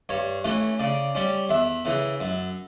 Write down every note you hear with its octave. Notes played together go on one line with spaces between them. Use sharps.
G2 C#5
E3 A3 C#4
C#3 D5
G3 C#4
E2 E5
C#3 E3
F#2